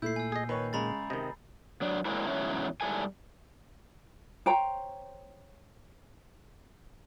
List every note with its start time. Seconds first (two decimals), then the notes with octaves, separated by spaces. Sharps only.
0.02 A#2 A3 E4 G6 C7
0.16 G#5 E6
0.32 G#4 D#5
0.49 D#3 B4 C#5
0.73 C#3 G#3 A#5 B5 A6
1.10 C3 D#3 D#5
1.82 F#3 D4
2.05 F#3 G#3 A#3 C4 D4 E4
2.27 E2 G#2 F#3 G3 C#4 E4
2.81 G#2 G3 E4 A4 G#5
4.46 C5 C#5 G5 A#5